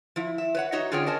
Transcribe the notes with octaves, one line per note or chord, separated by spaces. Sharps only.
F3 E4
E5
B4 C#5 F#5
D#4 F#4 C#5 D#5 E5
D3 C#4 F4 G#4 C#5 G5
A#4 C#5 D#5 G#5 A5